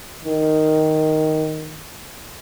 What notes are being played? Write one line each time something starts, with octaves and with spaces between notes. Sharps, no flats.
D#3